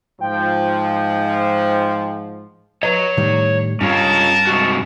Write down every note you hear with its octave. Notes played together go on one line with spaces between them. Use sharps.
G#2 F3 G5
B4 C#5 D#5 A#5
A2 D#3 G3
G2 C#4 F4 A#4 C#5 A5
C3 G#3 F#4